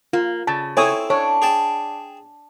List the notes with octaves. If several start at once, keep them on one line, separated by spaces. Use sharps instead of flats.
A#3 F4
C#3 A5
C4 E4 A4 C#5 G#5 D#6
D4 C#5
G#4 G5 A5